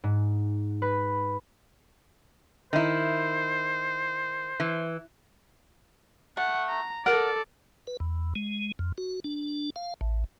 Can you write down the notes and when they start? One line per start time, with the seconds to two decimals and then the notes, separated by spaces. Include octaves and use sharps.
0.04 G#2
0.82 B4
2.73 D#3 E4 C5
4.60 E3
6.37 A3 F#5
6.69 A#5
7.06 A4 A#4 D5 F#5
7.87 B4
8.00 E2
8.36 G#3
8.79 F2
8.98 F#4
9.24 D4
9.76 F5
10.01 A1